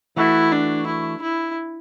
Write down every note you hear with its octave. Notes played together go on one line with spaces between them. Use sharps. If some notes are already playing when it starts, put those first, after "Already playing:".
E3 A3 E4 F#4
D4
E4
E4